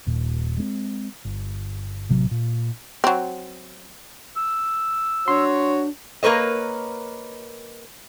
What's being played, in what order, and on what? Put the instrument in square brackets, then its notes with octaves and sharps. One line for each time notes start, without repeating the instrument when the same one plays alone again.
[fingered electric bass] D#1 A#2
G#3 B3 C4
G1
A1 C3 F#3
A#2
[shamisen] F#3 C4
[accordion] E6
[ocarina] D4 [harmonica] F#4 C#5 [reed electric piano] C6
[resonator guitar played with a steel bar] A#3 A#4 B4 C#5 D#5